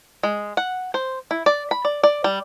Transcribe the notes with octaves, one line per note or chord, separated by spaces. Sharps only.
G#3
F#5
C5
E4
D5
B5
D5
D5
G3